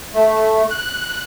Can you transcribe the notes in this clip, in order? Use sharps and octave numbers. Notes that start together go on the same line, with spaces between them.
A3
F#6